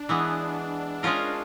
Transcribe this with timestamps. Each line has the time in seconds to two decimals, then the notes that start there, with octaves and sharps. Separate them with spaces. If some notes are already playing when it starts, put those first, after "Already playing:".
Already playing: D4
0.09 E3 G#3 B3
1.03 G#3 C#4 F4 A#4